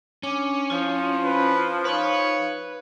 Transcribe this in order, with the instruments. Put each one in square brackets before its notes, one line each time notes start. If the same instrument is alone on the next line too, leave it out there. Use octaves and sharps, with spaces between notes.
[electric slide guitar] C#4 [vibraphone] D4 D6
[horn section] F3 [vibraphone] E4 F4
[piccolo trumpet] B4
[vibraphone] D#4 F5 [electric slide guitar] B4 [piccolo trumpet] C#5